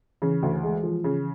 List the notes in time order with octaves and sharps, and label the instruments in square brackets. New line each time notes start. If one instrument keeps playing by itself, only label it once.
[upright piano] C#3 [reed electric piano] E3
[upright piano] D2
G#3
F3
C#3